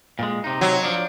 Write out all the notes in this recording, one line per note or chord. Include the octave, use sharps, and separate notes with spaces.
A#2 G#3
C3 D#4
F#3
F3 D4